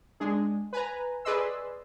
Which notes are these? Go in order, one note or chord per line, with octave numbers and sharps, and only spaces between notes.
G#3 D4 G#4
B4 G#5 A#5
G#4 B4 D5 D#5 C6 E6